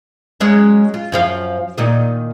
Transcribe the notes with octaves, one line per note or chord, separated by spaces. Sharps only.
F#3 G#3 C#4
F4
F#2 F3 F5
A#2 D#3 D#5